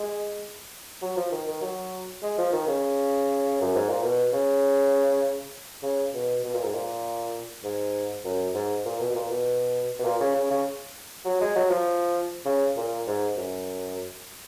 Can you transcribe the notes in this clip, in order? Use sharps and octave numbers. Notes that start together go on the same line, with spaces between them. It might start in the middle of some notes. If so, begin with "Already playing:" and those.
Already playing: G#3
F#3
F3
D#3
D#3
F#3
G#3
F3
D#3
C#3
F#2
G#2
A#2
B2
C#3
C#3
B2
B2
A#2
G#2
A#2
G#2
F#2
G#2
A#2
B2
B2
A#2
B2
B2
A#2
C#3
C#3
C#3
F#3
G#3
F#3
F3
C#3
A#2
G#2
F#2